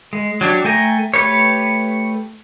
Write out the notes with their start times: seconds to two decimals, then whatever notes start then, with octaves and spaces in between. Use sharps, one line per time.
0.13 G#3
0.41 F#3 D4 G4
0.65 A3 G5 G#5 A#5
1.14 A3 G4 B4 C#5